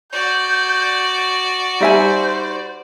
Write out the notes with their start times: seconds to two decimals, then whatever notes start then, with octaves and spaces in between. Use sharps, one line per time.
0.13 F#4 D5 G6
1.80 G3 D#4 C5 E5 G#5